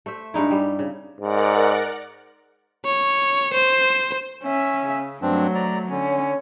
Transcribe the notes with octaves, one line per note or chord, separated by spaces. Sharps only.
A3 C5 E5
G2 G#3 D#4 E4
G3
C#3
G#2 A#4 D5 F#5
C#5
C5
C#4 E5
C#3
G2 F#3 A3 C4 D4
D5 A#5
D3 C#4